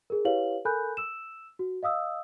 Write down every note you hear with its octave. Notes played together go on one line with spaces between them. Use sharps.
G#4 A#4
E4 G4 B4 C#5 F5 F#7
A4 A#4 G#5 B5 F#6 G6
E6 E7
F#4
D#5 F5 D#6 E6